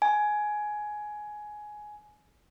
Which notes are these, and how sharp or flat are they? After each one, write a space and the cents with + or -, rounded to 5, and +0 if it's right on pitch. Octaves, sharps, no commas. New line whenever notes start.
G#5 +15